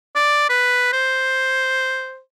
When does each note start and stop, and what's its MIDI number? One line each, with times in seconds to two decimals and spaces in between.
0.15 0.45 74
0.50 0.91 71
0.93 2.20 72